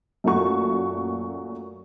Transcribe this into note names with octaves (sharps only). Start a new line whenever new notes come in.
F#2 A#2 A3 F#4 C#6